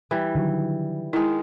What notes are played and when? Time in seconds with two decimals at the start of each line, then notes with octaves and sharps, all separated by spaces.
0.11 E3 G3
0.35 D3 D#3 F#3
1.13 D#3 G#3 E4